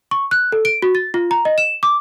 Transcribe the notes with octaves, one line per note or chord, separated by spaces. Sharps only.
C#6
F#6
A4
D7
F#4
A6
F4
A#5
D#5
E7
D6